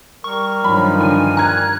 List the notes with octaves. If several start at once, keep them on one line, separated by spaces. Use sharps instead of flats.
G3 A#4 C#6
G2 D#3 F3 F#3 B5
D3 G#5
A#5 F#6 G#6